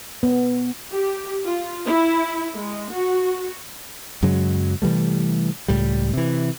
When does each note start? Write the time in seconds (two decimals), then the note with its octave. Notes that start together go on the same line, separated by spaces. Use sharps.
0.23 B3
0.91 G4
1.45 F4
1.87 E4
2.53 G#3
2.91 F#4
4.23 F#2 C#3 F#3 G#3
4.82 C3 E3 G3 A3
5.68 C#2 A2 G3
6.13 C3 E3